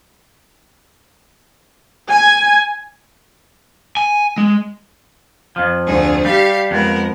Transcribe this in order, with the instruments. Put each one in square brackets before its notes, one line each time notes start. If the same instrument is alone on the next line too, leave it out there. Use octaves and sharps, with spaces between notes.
[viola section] G#5
[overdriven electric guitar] G#5
G#3
[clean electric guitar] F2 F3
[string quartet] D2 G#4
[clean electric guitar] G3 [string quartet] G4 F5
[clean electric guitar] F2 [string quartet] G#3 B3 A#4